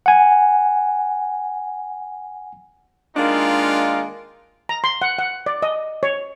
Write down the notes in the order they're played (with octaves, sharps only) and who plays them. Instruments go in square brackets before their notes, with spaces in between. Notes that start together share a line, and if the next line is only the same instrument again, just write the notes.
[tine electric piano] F#5 G#5
[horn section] D#3 G#3 A#3 D4 D#4 F4
[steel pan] A#5
C6
F#5
F#5
D5
D#5
C#5